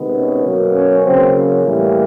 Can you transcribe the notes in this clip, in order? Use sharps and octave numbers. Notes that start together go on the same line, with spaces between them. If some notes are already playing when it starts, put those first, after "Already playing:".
Already playing: C3 D#3 G#3 B3
C#4
B2 F#3 A#3
C#4
C#3 F#3 A#3 C4
C#4
A2 E3 G3 A#3 C#4